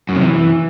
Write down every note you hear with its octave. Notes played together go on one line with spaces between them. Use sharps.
F#2
C3
E3